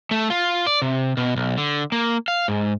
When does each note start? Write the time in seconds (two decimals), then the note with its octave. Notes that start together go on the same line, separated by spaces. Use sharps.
0.11 A3
0.30 F4
0.67 D5
0.82 C3
1.17 B2
1.36 B1
1.58 D3
1.92 A#3
2.28 F5
2.48 G#2